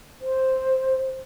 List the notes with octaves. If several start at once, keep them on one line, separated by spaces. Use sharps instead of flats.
C5